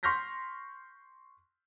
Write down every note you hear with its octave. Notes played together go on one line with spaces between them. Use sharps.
C6 C#6 F6 G6 A#6 B6